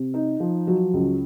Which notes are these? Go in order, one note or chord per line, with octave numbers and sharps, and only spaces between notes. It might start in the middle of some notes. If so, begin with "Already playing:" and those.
Already playing: C3
D#4
F3
F#3
C#2